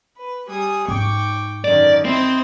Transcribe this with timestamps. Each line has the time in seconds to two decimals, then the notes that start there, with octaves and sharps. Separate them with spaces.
0.18 B4
0.48 G3 G#4 D#6
0.88 G#2 D#4 G5 C#6 D6
1.65 F#2 D3 D#3 D5
2.05 C4 E4 D#5